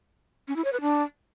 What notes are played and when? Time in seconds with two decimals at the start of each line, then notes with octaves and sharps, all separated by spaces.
0.48 C#4
0.56 E4
0.64 C#5
0.73 B4
0.81 D4